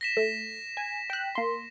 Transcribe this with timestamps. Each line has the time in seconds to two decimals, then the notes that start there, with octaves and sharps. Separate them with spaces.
0.01 A#6 B6 E7
0.17 A3
0.77 G#5
1.10 G5 F#6
1.35 A#3 C6